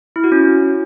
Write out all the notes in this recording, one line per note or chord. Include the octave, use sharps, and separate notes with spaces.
E4
F#4
C#4